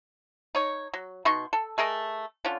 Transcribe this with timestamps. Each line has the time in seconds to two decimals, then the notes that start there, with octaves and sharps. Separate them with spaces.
0.55 D#4 C#5
0.94 F#3
1.25 B2 D#4 C6 C#6
1.53 A4
1.78 A3 G#4 A#4 D#5
2.45 D3 C#4 F4